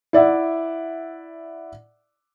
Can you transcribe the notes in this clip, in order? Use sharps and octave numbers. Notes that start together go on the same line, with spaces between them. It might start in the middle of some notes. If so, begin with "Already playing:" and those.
E4 D5 E5 F#5